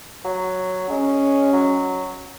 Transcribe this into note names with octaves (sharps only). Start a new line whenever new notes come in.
F#3
G#3 C#4
F#3